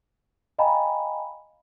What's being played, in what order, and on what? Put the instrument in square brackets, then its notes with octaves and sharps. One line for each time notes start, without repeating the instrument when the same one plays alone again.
[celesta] D#5 F5 G5 G#5 A#5 B5